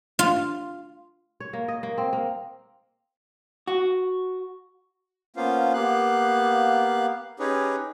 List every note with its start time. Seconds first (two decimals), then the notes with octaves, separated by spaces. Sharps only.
0.19 F4
1.40 C#5
1.53 A#3
1.68 D#5
1.83 A#3
1.98 C4
2.13 A#3
3.67 F#4
5.36 A#3 B3 C#4 F4 C5 F5
5.73 A#3 B3 G4 F5 F#6
7.39 C#4 D#4 G4 G#4 B4 C#5